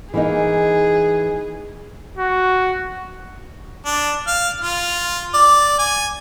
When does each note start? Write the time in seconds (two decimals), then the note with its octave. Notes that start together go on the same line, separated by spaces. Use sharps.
0.14 E3 A#3 D#4 G#4
2.17 F#4
3.86 D4
4.27 F5
4.62 F4
5.34 D5
5.79 G#5